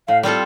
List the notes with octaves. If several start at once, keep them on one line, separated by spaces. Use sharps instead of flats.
A2 F5
G3 C4 F4 A4